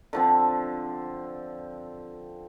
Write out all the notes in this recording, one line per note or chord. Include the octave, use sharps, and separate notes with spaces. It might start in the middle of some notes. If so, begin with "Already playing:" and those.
D3 F3 C4